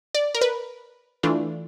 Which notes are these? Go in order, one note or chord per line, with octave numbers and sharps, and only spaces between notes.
D5
A#4
B4
E3 A3 D4 F4